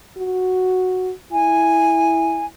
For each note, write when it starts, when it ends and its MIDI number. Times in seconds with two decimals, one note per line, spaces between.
0.18 1.12 66
1.32 2.49 64
1.32 2.45 80